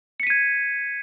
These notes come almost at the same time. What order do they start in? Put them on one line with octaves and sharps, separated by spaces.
C#7 B6 D#7 G#6